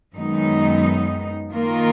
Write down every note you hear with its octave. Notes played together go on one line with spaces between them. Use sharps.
F#2 D#3 G#3 B3 D#4
D#3 A#3 F4 A#4